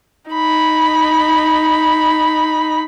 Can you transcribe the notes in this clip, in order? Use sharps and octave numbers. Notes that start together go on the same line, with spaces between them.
D#4 B5